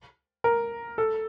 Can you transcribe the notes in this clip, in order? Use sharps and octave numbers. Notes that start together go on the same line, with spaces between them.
A#4
A4